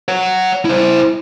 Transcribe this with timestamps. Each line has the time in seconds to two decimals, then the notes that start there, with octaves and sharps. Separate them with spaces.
0.08 C#5 F#5
0.65 E4 C5